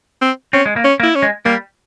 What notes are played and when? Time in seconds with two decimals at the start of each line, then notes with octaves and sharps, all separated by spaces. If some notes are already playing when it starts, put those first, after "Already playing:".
0.21 C4
0.53 C4 C#4
0.66 G#3
0.76 A#3
0.84 C#4
1.00 A#3
1.03 E4
1.15 C#4
1.22 G#3
1.45 G3 A#3